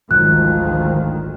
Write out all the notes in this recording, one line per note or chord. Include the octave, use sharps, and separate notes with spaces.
G#1 D2 G#2 D#3 F3 F#3 G#3 F#6